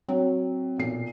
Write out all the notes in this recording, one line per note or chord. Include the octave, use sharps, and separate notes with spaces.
F#3 C4 F#4 C#5
B1 A#2 C7